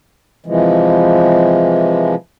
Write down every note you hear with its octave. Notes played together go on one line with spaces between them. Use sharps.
C3 E3 F3 G#3